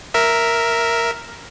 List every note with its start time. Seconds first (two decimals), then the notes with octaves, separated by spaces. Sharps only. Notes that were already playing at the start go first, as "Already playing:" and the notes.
0.14 A#4 E5